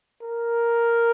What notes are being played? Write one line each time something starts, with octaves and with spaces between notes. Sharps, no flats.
A#4